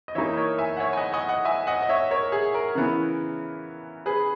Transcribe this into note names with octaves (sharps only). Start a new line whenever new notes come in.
D#5
E3 A#3 D#4 C#5 E5
D#5
A#4 C#5
E5 G#5
F#5
C#5 E5
G#5
D#5 F#5
D#5 F#5
D#5 F#5
E5 G#5
D#5 F#5
D#5
C#5 E5
A#4 C#5
G#4
A#4
C#3 E3 B3 E4
G#4 B4